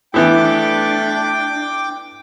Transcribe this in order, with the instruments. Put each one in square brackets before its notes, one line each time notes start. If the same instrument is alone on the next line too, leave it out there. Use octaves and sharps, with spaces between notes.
[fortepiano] E3 B3 E4 [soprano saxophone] A3 [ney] D4 [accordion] G5 D6